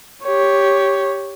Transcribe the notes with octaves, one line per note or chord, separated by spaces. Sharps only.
G4 C#5